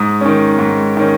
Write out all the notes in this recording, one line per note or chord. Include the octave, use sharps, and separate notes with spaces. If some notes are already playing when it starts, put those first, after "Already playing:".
Already playing: G#2 D#6
D#3 C#4
G#2
D#3 C#4